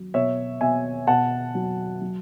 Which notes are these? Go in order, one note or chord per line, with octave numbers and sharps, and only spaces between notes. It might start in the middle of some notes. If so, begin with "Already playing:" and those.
Already playing: F#3
B2 C#5 E5
B2 E5 G#5
B2 F#5 A5
F#3
F#3